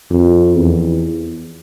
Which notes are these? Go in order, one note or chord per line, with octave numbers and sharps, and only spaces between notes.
F2
E2